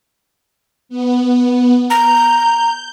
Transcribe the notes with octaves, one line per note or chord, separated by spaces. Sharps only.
B3
A#5 G6